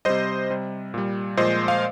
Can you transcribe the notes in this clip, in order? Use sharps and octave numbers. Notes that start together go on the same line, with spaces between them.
C3 G3 C5 D#5
C3 G3
A#2 G3
A#2 F3 G#3 C5 D#5
F5